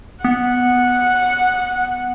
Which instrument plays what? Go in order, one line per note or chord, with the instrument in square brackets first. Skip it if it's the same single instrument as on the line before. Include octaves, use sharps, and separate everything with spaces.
[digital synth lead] B3 [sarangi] F#5